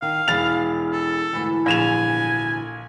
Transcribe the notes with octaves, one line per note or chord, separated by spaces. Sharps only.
D#3 F5
E1 E3 A6 F7
A4
D2 G#2 E3
A#1 G#5 E7 F7